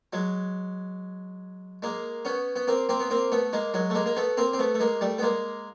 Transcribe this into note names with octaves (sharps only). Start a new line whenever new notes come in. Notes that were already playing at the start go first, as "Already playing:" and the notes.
F#3 G#3
G#3 A#3
B3 C#4
B3
A#3 C4
A#3 C4
B3
A#3 C4
A3 B3
G#3 A#3
F#3 G#3
A3
G#3 A#3
A#3
A3 B3
A#3 C4
C4
A3 B3
A3
G#3 A#3
G3 A3
B3
G#3 A#3